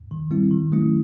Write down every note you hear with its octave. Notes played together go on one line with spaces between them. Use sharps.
D#3
G3 C4 E4
D#3
F#3 A3 C#4 E4